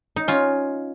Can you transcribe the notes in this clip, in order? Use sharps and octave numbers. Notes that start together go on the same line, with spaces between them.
D#4
C#4 F4